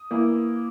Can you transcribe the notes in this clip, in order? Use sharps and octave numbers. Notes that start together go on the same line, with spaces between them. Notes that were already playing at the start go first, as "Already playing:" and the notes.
Already playing: D#6
E3 A#3 E4